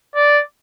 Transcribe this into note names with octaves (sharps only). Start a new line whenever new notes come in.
D5